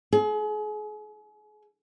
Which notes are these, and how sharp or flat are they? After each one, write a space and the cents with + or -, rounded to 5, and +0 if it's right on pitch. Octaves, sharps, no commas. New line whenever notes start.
G#4 +35